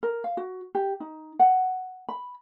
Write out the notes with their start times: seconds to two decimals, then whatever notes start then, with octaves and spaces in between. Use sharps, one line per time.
0.03 A#4
0.24 F5
0.37 F#4
0.75 G4
1.00 D#4
1.39 F#5
2.09 B5